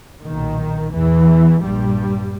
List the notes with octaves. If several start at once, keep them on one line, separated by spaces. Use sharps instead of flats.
B1 A#2 D#3
E2 E3
A#1 G2 A#2 G3